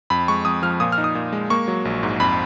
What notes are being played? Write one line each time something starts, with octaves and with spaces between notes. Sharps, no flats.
F2 B5
G#3 C#6
F2 D#6
F3 F6
A#2 D#6
F6
D#4
D#6
A#2
G#3
A#3 C#6
F#3
A#1
G#2
F2 B5